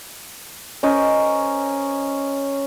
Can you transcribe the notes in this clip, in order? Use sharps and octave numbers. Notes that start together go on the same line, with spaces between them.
C#4 A#4 C5 D#5